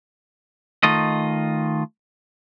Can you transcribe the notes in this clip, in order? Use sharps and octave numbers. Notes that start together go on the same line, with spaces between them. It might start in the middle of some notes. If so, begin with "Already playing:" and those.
D#3 A3 F4 D#5